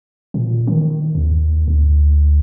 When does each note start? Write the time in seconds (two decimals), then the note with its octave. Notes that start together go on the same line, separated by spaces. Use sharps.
0.34 A#2
0.67 D#3
1.15 D#2
1.68 D2